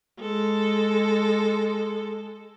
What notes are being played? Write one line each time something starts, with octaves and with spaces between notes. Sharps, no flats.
G#3 A4